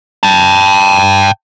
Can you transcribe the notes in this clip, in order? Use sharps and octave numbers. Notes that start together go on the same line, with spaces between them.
G5 A5